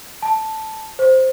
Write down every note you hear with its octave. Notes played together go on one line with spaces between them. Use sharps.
A5
C5